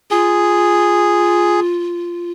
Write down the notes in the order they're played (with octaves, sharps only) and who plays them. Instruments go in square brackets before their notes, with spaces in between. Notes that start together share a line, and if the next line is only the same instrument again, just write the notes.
[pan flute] F4 [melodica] G#4